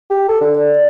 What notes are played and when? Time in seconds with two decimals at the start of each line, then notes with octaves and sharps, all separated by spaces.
0.10 G4
0.28 A4
0.41 D3
0.55 D5
0.74 D5